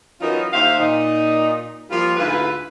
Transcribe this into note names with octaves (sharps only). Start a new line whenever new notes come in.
E3 F#3 C#4 D#4 F4 A#4
D#2 G4 C5 E5 F5
A#2 D#4
F3 G3 A#3 F4
D2 G#2 E4 F4 B4